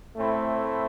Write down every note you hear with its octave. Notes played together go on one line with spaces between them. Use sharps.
A2 A3 C4 E4